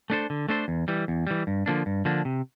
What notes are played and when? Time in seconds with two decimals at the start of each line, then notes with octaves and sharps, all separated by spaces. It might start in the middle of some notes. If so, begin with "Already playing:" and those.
0.10 A3 D4 A4 C5
0.30 D3
0.48 A3 D4 A4 C5
0.68 E2
0.88 E3 G3
1.08 E2
1.27 E3 G3
1.47 G2
1.66 D3 F3 A#3 D4
1.86 G2
2.05 D3 F3 A#3 D4
2.25 C3